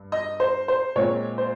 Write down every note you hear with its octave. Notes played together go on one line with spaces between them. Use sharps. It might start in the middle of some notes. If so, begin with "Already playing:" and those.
Already playing: G2
D#5
C5
C5
A#2 G#3 C4 C#5
C5